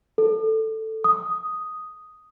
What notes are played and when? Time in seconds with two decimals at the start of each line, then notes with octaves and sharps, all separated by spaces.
0.18 A4
1.04 D#6